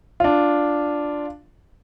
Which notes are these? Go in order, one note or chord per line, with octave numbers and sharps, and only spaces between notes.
D4 F4